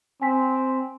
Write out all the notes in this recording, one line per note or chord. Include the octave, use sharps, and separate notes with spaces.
C4 G#5 B6